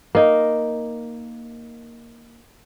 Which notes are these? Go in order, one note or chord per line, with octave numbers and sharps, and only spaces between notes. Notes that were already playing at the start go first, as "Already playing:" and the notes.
A#3 D#4